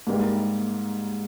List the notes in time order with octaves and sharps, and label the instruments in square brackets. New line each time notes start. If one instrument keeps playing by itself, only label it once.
[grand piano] G#2 G3 A#3 D#4 G4